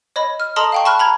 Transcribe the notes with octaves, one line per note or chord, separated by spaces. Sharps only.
C#5 D#5 B5
F6
A4 D#5 A5 A#5 C6 D#6
F5 G5 C#6
A5 B5 C#6 F6 F#6
A#5 B5 G#6